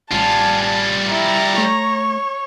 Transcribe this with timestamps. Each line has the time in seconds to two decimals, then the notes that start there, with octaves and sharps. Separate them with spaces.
0.12 A1 G3 F4 G#5 A5
1.09 E4 A#5
1.58 A3 C#5